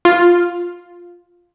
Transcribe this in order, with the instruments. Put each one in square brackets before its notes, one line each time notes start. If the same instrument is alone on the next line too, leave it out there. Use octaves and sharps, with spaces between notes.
[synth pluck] F4